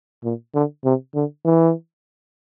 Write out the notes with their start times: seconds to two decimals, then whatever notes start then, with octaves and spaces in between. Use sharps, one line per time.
0.24 A#2
0.55 D3
0.85 C3
1.15 D3
1.45 E3